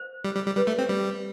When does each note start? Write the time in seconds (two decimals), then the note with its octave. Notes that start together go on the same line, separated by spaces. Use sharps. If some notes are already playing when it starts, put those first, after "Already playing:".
Already playing: C5
0.25 G3
0.35 G3
0.46 G3
0.56 G3 B4
0.67 A3
0.78 C4
0.89 G3